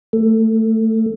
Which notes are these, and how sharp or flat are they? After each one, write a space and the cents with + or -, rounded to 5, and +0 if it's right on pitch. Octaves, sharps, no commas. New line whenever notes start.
A3 +15